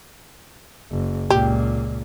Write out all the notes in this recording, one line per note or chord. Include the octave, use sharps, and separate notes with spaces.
F#1
C#2 A#2 G4